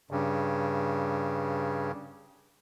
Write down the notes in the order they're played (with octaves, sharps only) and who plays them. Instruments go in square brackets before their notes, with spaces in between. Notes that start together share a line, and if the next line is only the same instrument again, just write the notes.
[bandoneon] G2 C#3